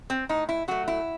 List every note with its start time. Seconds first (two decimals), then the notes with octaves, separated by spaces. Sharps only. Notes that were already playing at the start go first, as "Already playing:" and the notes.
0.10 C4
0.29 A2 D#4
0.49 E4
0.68 F#3 A3 F#4
0.88 E4